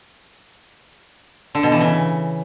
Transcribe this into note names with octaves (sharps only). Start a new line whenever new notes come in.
D3
B2
E3
C#3